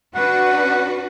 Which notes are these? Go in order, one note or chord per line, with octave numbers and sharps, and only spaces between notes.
D4 F#4 B4 F#5